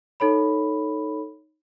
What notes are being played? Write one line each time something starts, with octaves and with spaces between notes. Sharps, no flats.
D#4 A4 C#5 B5